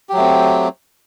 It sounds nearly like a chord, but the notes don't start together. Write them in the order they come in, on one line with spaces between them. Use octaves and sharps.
G4 F#3 A3 C4